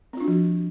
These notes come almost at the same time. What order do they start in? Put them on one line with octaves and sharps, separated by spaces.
C4 F4 D4 F#4 F3